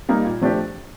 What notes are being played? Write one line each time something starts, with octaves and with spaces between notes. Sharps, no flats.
G3 A#3 D#4
A#2
F3 A3 D4 G4